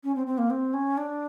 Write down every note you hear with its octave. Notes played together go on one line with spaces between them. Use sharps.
C#4
C4
C4
A#3
C4
C#4
D4